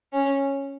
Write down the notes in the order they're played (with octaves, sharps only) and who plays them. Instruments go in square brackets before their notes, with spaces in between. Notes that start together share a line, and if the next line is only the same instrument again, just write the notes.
[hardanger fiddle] C#4